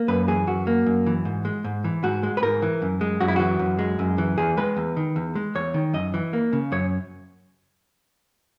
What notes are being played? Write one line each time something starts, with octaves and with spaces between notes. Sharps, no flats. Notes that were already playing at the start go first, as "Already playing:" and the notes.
Already playing: A#3
F#2 B4
E3 G#4
F#2 F#4
A#3
F#2
E3
G#2
G#3
G#2
E3
G#2 F#4
G#3
B4
G#2 A#4
E3
F#2
G#3
F#2 F#4
E4
E3 F#4
F#2
G#3
F#2
E3
E2 G#4
G#3 B4
E2
D#3
E2
G#3
E2 C#5
D#3
F#2 D#5
E3
A#3
C#3
F#2 C#5